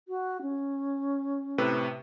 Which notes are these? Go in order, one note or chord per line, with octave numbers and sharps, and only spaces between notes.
F#4
C#4
A2 C3 B4